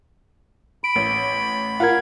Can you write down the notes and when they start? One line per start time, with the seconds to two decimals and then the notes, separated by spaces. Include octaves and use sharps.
0.84 B5 D7
0.96 A1
1.80 F4 A#4 F#5 G#6